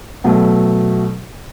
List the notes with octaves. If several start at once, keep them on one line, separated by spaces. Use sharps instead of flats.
B2 F#3 A3